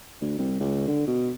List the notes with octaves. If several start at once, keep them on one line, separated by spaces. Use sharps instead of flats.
D2
C2
C#2
D3
B2